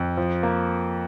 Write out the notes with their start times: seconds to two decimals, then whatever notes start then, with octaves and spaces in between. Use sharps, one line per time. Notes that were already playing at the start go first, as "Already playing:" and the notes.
Already playing: F2
0.17 F3
0.43 A#3